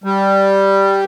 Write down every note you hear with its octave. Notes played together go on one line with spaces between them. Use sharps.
G3